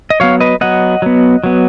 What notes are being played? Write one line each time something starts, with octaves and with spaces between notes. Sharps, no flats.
D#5
F#3 B3 C#5 F5
B4 D#5
F#3 B3 D#5 F#5
F#3 B3
F#3 B3